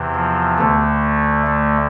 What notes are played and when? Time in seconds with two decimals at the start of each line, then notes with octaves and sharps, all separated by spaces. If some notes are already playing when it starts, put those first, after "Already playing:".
Already playing: E2 C3 E3
0.15 F3
0.59 D2 D3 A3
1.47 A3